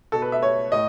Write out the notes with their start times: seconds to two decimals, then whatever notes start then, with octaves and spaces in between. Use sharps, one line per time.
0.12 B2 A4
0.22 B4
0.32 E5
0.42 C#5
0.72 A2 D#5